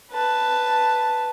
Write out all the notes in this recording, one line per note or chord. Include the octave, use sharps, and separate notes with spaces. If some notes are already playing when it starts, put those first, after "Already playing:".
B4 A5